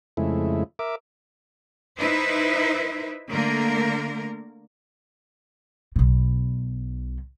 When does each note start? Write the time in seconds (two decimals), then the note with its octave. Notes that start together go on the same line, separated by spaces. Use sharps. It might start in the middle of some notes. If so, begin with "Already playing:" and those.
0.17 F2 C#3 G#3 A3 E4
0.79 A#4 E5 D6
1.98 D#4 E4 B4 C5 E5
3.30 D3 A3 A#3 A#4
5.96 B1 B2